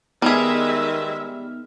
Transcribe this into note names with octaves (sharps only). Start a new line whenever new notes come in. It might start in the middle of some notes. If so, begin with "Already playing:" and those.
D#3 G3 G#3 B3 D#4 G#4 E5 F6